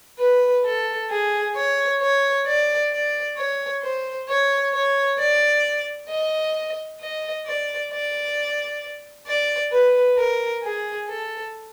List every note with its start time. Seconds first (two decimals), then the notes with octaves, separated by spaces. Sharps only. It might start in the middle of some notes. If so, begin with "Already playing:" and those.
0.19 B4
0.65 A4
1.11 G#4
1.56 C#5
2.01 C#5
2.46 D5
2.92 D5
3.37 C#5
3.83 C5
4.29 C#5
4.73 C#5
5.19 D5
6.09 D#5
7.00 D#5
7.46 D5
7.92 D5
9.27 D5
9.72 B4
10.18 A#4
10.63 G#4
11.09 A4